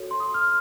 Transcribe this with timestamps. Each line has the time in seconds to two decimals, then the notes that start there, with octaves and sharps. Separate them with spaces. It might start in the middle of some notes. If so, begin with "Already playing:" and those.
Already playing: F#4 A4 C#5
0.11 C6
0.20 D#6
0.34 F6